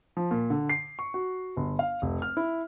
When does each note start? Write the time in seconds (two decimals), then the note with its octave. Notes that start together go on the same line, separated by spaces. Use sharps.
0.17 F3
0.31 A#2
0.50 D3
0.70 C7
0.99 C#6
1.14 F#4
1.57 G1
1.79 F5
2.02 F1
2.22 F6
2.37 E4